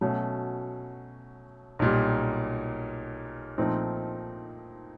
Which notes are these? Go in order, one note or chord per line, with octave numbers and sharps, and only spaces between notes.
B2 F#3 A3 C#4
B1 A#2 G3
A#2 F3 A3 C4 D#4